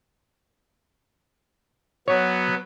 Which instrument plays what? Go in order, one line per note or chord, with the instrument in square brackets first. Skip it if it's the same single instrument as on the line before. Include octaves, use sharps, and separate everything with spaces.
[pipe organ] F#3 B3 [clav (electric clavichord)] C#5